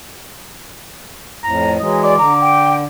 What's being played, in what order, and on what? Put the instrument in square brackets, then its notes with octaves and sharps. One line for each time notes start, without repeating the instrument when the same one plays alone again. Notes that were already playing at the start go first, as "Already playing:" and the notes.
[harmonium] F2 A2 [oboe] A#5
[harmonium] E3 F#3 G#3 [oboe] D#5
[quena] D5 [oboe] D6
[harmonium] D3 [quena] A#5
[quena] G5